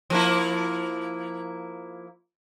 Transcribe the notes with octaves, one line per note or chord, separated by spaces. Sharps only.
F3 A#3 E4